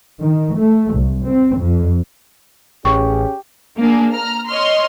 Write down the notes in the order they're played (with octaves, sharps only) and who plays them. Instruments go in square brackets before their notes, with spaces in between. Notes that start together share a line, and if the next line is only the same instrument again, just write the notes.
[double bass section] D#3
A3
C2
C4
F2
[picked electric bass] A1 [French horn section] C#4 G#4 [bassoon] G4 [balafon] C#6
[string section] A#3 D4 G#4
A#5 F6
C#5 D#5 C6 F6